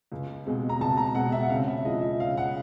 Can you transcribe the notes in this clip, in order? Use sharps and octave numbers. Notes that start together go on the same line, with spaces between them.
C#2
B2 G#3 C4
A#5
C#2 A5
A#5
B2 G#3 C4 F#5
E5
F#5
C#3 F5
E5
F3 G#3 D#5
E5
C#3 F5
F#5